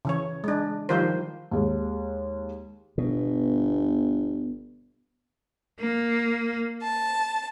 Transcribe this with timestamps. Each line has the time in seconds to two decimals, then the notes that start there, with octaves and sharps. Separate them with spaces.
0.05 C#3 E3 C#5
0.44 G#3 D4
0.89 D#3 F3 G3 F4 A#4 C5
1.51 D#2 G#3
2.98 G1 B2
5.79 A#3
6.83 A5